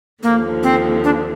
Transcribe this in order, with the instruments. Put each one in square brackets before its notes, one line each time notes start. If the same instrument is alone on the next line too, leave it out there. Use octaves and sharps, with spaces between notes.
[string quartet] D#2 D3 F3 [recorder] A#3
[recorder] C4
D4